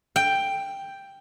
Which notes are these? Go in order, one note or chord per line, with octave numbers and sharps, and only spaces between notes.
G5